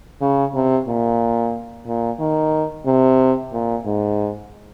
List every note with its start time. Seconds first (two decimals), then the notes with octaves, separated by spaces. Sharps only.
0.21 C#3
0.55 C3
0.88 A#2
1.87 A#2
2.20 D#3
2.86 C3
3.53 A#2
3.86 G#2